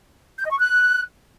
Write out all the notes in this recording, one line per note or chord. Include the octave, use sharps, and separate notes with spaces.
G6
D#5
C#6
F#6